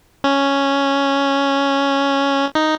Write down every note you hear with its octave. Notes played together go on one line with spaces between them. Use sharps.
C#4
D#4